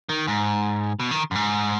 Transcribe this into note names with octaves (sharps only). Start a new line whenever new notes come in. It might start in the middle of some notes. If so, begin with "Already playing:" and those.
D#3
G#2
B2
D#3
F#2
G#2